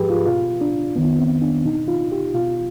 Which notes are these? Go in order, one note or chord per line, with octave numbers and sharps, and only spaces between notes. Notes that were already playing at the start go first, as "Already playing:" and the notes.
Already playing: G#2 F3 G4 G#4 B4
F4
B2 F4
D4
F2 D#3 B3
C4
D4
B2 D#4
F4
G4
B2 F4